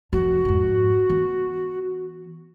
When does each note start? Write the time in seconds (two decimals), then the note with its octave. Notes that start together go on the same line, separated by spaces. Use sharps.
0.13 F1 F2 F#4
0.45 F2 G#2
1.09 E3 B3